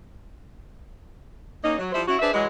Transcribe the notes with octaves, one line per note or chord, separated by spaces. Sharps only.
A#3 C#4 D#4
F#3
F3 G3 E4 C5
C#4 E4 F#4
D4 G#4 B4 C5 E5
E3 F#3 G#3